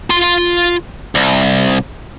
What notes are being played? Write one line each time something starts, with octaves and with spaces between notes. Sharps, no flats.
F4 C6
C2